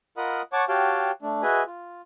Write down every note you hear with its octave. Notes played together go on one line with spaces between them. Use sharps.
F4 A#4 D#5 F#5 B5 D#6
C#5 F#5 A5 C#6 D6
F#4 G4 C#5 F5 G5 A5
A3 D4
F#4 G#4 B4 D#5 E5 G#5
F4